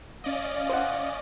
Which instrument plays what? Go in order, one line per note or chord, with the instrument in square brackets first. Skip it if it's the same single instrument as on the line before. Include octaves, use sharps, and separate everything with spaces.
[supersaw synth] C#4 D5 D#5 [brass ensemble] F5
[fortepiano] C5 F#5